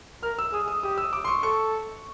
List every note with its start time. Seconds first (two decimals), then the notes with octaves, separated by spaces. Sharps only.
0.23 A#4 F6
0.39 E6
0.53 G#4 D#6
0.68 D#6
0.83 G4 D#6
0.98 E6
1.13 D6
1.25 C6
1.28 C#6
1.43 A4 C#6